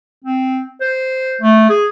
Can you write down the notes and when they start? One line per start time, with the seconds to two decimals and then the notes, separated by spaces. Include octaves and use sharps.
0.24 C4
0.80 C5
1.41 A3
1.69 G#4